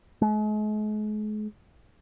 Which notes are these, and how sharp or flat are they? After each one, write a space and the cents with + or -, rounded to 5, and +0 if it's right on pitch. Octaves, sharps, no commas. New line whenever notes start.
G#3 +40